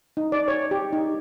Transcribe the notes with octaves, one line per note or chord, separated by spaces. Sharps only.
D#4
D5
C#5
G4
D#4